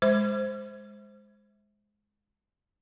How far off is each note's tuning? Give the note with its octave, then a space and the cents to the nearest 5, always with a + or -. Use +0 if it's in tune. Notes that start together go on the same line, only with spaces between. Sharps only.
G#3 +0 C5 +0